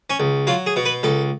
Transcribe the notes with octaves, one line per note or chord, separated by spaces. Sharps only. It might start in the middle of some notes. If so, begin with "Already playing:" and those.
C#4
C#2
F#3 F4
G#4
B2
B4
C#2 A4